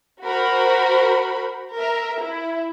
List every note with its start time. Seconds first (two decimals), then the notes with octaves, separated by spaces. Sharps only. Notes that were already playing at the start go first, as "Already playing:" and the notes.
0.22 F#4 A#4 C5 B5
1.76 A#4 E5
2.21 E4